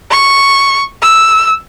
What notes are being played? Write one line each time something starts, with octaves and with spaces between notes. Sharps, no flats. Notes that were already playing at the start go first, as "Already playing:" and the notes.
C#6
E6